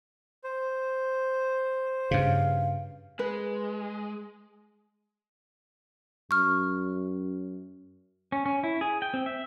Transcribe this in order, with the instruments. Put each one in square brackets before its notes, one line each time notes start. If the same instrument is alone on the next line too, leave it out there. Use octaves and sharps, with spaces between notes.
[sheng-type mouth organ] C5
[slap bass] G2 C#3 [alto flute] F5
[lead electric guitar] G#3 [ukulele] B4
[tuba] F#2 [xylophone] C#6 F6
[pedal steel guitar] C#4
C#4
E4
G#4
G5
C4
E5